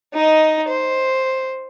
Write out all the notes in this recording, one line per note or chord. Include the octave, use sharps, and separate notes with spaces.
D#4 D#5
C5